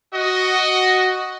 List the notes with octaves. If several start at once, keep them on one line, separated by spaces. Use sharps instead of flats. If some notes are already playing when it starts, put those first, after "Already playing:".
F#4 D#5